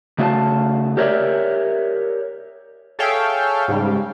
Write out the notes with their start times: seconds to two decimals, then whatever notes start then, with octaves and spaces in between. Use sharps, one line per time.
0.18 C#3 A3 F#4 C#5 F5 A5
0.97 G4 A#4 C#5 D5 E5
2.99 G#4 A4 C#5 E5 F5 G5
3.68 G#2 C#3 G3